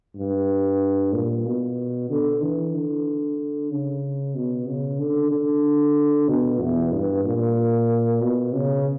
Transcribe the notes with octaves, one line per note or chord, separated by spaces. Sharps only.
G2
A#2
B2
D3
E3
D3
C#3
B2
C#3
D3
D3
B2
E2
G2
A#2
B2
C#3